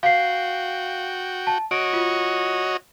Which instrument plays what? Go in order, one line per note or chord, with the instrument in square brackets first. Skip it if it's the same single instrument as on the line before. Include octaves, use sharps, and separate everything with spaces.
[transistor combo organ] F#4 G5 [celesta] F5 C7
[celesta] A5
[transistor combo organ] F#4 C#5 D#5 [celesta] D7
[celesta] F4